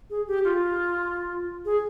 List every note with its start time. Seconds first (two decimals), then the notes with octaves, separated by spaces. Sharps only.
0.10 G#4
0.27 G4
0.45 F4
1.65 G#4